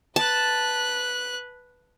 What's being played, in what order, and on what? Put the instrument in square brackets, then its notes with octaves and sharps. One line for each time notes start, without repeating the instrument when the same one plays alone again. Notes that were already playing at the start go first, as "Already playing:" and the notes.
[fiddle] B4 F#6 [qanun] A5